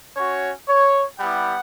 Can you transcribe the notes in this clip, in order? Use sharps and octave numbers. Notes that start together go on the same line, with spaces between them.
C#4 F#4 C#5
C#5
G3 B3 E4 G4 F#5